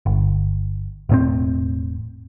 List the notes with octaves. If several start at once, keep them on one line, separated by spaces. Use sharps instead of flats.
G1
E1 A2 C4